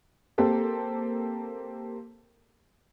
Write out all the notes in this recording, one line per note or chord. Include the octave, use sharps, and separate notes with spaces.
A#3 C4 G4 A4